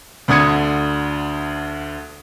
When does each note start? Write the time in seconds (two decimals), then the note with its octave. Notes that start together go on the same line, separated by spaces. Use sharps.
0.28 D2 D3 D#6 G#6 C#7